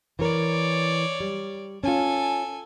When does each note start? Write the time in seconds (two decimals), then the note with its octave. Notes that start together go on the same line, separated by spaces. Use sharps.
0.19 E3 A#4 C#5 D5
1.20 G3
1.84 C#4 F4 A4 G#5